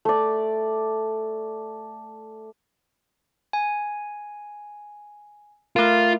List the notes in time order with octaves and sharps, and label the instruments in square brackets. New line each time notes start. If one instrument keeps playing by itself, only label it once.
[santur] A3 D5
[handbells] G#5
[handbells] A3 A#4 [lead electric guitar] F4